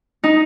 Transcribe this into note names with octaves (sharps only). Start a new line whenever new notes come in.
D#4